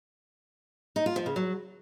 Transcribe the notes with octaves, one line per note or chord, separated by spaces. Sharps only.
D#4
F4
F3
C#3
F#3